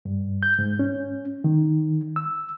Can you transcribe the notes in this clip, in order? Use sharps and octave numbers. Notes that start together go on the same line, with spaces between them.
G2
G6
G#2
C#4
D#3
E6